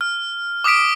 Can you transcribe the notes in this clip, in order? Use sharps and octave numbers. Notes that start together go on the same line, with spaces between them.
F6
D6 D#6 F6 B6 D7